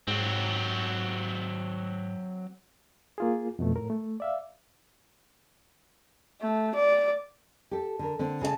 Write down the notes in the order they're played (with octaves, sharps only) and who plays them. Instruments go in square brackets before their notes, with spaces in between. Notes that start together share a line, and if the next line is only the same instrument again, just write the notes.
[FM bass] G#2 [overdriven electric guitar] F#3 C4
[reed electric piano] A#3 F4 G#4
F2 B2 A3
A2 A#4
A3
D5 E5 F5
[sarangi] A3
D5
[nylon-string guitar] G4 A4
D3 A#4
D3 C4
C#3 G#4 D#5 A5